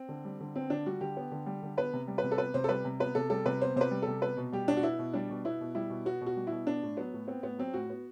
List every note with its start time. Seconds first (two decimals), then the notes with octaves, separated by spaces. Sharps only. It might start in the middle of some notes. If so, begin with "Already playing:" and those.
Already playing: C4
0.09 D3
0.25 G3
0.40 D3
0.56 B3 C4
0.70 D3 D4
0.86 G3 F#4
1.01 D3 G4
1.17 B3
1.32 D3
1.46 G3
1.63 D3
1.77 B3 B4
1.93 C3
2.08 G3
2.18 B4
2.23 C3
2.31 A4
2.38 B3 B4
2.54 C3 C5
2.64 A4
2.69 G3 B4
2.85 C3
3.00 B3 B4
3.15 C3 A4
3.30 G3 A4
3.46 C3 B4
3.61 B3 C5
3.76 C3 C5
3.81 B4
3.91 G3
4.02 A4
4.07 C3
4.22 B3 B4
4.37 B2
4.52 G3 G4
4.68 B2 D4
4.77 F#4
4.83 B3 E4
4.99 B2
5.13 G3 D4
5.30 B2
5.45 B3 E4
5.61 B2
5.75 G3 E4
5.90 B2
6.06 B3 F#4
6.21 B2
6.26 F#4
6.36 G3
6.47 B2 E4
6.67 B3 D4
6.83 A2
6.97 F#3 B3
7.14 A2
7.28 B3 C4
7.43 A2 B3
7.58 F#3 C4
7.74 A2 F#4
7.90 B3